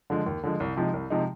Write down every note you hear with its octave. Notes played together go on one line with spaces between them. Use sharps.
D3 F3 G#3
D#2
D3 F3 G#3
C2
C3 F3 G#3 D#4
C2
C3 F3 G#3 D#4